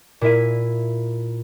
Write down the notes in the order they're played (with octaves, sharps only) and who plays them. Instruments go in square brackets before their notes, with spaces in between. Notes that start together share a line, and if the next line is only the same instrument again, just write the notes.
[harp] A#2 E4 E5 D#7